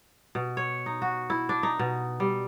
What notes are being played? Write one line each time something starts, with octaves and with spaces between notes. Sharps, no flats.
B2
C#5
D#4
F#4
E4
D4
D#4
B2
G3